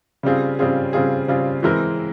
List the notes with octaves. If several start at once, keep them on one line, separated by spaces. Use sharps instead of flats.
C#3 G3 C4 F4 G#4
C#3 G3 C4 F4 G#4
C#3 G3 C4 F4 G#4
C#3 G3 C4 F4 G#4
E3 G#3 C4 E4 A#4